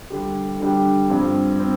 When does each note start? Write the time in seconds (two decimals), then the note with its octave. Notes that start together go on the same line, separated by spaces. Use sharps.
0.10 D3 G3 D4 G4
0.60 D3 G3 D4 G4
1.09 G2 F3 C4
1.60 C4